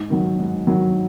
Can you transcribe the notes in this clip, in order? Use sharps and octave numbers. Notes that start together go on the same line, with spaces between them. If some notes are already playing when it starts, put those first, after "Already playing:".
Already playing: G#2
D#3 F#3
G#2
D#3 F#3